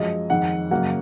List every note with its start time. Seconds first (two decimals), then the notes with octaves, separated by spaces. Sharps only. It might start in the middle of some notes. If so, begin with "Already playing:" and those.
Already playing: F#2 F3 G#3 D#5
0.29 F2 D#3 G#3 F#5
0.71 F#2 C#3 F#3 A#3 F#5